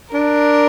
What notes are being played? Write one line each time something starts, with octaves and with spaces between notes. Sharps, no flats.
D4 A#4